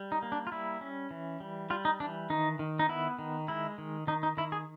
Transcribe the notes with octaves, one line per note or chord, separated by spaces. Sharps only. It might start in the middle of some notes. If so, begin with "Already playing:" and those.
Already playing: G3
D#4
A#3
D4
F4
G3 E4
C#4
E3
G3
G3 F4
D#4
E3 D4
D#3 D#4
D#3
D#4
B3 E4
D#3
G#3 E4
D#3
D#3 D#4
D#4
D#3 E4
G#4